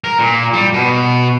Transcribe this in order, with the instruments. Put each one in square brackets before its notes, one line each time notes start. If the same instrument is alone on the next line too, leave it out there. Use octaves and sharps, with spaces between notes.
[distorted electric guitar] A#4
A#2
G3
B2